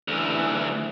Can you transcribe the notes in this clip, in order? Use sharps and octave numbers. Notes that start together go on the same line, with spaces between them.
D2 E3